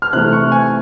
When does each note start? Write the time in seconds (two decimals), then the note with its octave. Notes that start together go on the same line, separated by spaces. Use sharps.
0.02 F6
0.13 C3 E3 A3 F#6
0.33 C#6
0.52 G#5